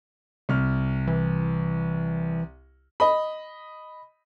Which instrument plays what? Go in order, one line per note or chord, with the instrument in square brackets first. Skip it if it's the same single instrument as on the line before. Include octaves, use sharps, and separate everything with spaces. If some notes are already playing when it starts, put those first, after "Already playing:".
[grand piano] C2 F6
[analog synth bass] E3
[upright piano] D#5 B5